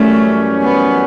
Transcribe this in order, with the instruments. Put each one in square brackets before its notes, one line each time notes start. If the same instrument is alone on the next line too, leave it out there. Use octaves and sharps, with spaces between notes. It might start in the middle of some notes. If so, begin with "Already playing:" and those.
Already playing: [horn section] F#2 E3 G3 C#4 [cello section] A3
[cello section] B3